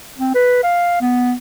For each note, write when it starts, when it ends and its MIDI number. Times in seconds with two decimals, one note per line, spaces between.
0.18 0.34 60
0.34 0.61 71
0.63 0.98 77
1.01 1.34 59